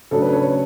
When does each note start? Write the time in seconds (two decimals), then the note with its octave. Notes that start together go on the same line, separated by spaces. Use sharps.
0.11 C#3 F#3 A3 D4 A4
0.22 B4
0.32 C#5